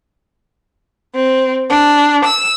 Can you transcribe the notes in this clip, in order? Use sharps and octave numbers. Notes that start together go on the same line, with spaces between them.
C4
D4
E6